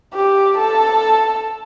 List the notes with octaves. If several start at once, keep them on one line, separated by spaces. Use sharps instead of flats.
G4
A4